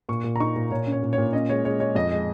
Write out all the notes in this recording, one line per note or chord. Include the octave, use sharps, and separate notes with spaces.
A#2 C#6
A#2
A#5
D#4 C#6
A#2
A#2 C#5
C#4
C#5
A#2
C#5
A#2
C#4 D#5
G#3 C#5
G#3 C#5
G#3 C#5
F2 D#5
G#3